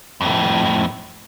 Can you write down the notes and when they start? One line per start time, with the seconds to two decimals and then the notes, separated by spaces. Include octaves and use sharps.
0.21 F2 A2